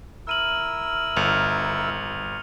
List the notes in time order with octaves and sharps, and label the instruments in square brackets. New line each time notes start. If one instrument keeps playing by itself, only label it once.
[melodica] E4 A#4 E6 [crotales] F6 D#7 F#7
[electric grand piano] G1 [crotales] F6 C#7 F7